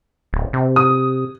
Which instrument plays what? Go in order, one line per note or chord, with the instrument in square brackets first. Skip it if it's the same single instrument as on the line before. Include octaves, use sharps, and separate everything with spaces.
[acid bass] D1
C3
[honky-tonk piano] D#6